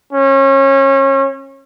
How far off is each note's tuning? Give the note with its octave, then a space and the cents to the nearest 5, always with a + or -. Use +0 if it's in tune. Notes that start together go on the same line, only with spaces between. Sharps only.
C#4 -30